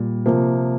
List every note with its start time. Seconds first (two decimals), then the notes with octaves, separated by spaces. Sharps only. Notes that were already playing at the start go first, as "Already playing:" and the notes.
Already playing: A#2 G3
0.26 C3 F3 A#3